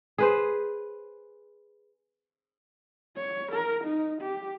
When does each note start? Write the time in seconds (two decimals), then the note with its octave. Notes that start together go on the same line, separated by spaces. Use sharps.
0.18 G#4 B4 C5
3.16 C#5
3.51 A#4
3.83 D#4
4.21 G4